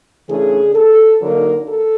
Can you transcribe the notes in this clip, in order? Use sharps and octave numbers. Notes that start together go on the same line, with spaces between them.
C#3 E3 A3 D4 G#4
A4
D3 F#3 A#3 D#4 A#4
A4